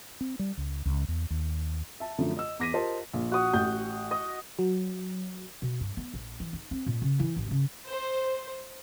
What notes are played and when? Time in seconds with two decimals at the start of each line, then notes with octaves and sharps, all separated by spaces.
0.21 C4
0.39 G3
0.57 C#2
0.85 C#2
1.08 E2
1.30 D#2
2.00 E5 A5
2.18 F#2 D3 F3 A3
2.37 D#5 E6
2.59 E2 D6 A#6 B6 D#7
2.73 F4 G4 A#4 C5 D#5 A5
3.13 A#1
3.32 F#4 D#6
3.53 A1 G6
4.11 D#5
4.59 F#3
5.62 B2
5.81 G2
5.97 B3
6.14 A#1
6.40 E3
6.53 D#4
6.71 C4
6.86 A#2
7.02 C#3
7.19 E3
7.36 A1
7.51 C#3
7.87 C5